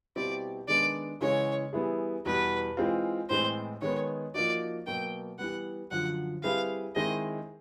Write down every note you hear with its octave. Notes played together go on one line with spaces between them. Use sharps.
B2 G3 C4 E4 G4 D5
D#3 G#3 B3 D4 D5
C#3 E3 G#3 C#4 C#5
E3 G3 B3 E4 G#4
E2 B2 G3 B4
E3 G#3 C4 F4
A2 E3 G#3 C4 C5
D#3 G#3 B3 C#5
F3 A#3 D#4 F#4 D5
B2 F#3 A#3 G5
E3 G3 B3 F#5
F#2 D3 F3 F#5
G3 C4 E4 G#4 B4 F5
D#3 G#3 C4 E4 G#4 D#5